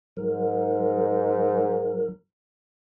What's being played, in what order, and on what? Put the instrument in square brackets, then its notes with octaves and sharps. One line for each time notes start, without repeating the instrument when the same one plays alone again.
[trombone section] G#2 [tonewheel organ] F#3 A#4